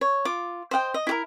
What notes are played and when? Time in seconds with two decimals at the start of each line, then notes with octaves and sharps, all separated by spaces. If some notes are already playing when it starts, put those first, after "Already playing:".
0.01 C#5
0.25 F4 D6
0.71 C5 D#5 F#5 G5
0.94 D#5
1.07 E4 G4 A#4